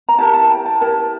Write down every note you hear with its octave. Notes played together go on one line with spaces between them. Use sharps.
A#5
E4 G4 A#4 A5
A5
G5
A5
E4 G4 A#4 A5